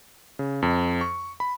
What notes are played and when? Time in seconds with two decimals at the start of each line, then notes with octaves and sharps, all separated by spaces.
0.39 C#3
0.62 F2
1.01 C#6
1.40 B5